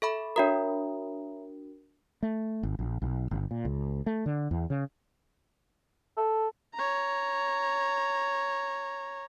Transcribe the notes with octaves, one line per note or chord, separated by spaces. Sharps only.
A4 E5 B5 C#6
D4 F#4 A#4 C#5 E5 A#5
A3
G#1
A#1
B1
G1
A#2
C#2
A3
D3
E2
C#3
A4
C#5 A#5